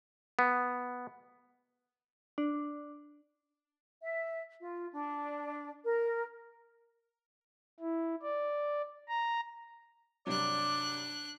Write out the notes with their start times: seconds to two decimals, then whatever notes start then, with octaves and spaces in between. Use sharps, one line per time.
0.39 B3
2.38 D4
4.02 E5
4.60 F4
4.91 D4
5.84 A#4
7.80 E4
8.22 D5
9.08 A#5
10.27 G2 C3 F#3 D4 D5 F#6